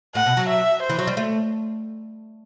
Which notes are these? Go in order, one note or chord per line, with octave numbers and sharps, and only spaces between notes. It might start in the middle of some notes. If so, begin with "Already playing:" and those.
A2 F#5
B2
F#3
E5
C5
E3
F#3
G3
A3